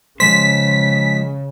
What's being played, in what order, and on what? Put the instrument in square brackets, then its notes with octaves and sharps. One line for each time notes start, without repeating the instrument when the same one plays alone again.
[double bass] C#3 [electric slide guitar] F3 G#3 C5 [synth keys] B6